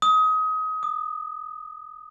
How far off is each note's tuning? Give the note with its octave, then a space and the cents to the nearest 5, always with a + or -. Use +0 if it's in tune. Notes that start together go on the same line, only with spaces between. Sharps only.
D#6 +25
D#6 -35